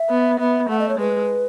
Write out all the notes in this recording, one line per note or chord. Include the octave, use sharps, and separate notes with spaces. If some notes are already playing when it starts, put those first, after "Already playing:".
Already playing: E5
B3
B3 E5
A3 F#5
D#5
C#5
G#3 B4